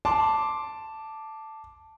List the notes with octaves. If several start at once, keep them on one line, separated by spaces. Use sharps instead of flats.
A5 C6 D6